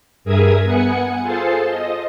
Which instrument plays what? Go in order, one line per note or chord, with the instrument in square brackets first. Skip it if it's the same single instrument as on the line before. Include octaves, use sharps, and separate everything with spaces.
[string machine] G2 G#4 A#4 E5 D#6 G#6
B3 F#5 G#5 C#7
F4 G#4 A4 C5 A5 C6
D#5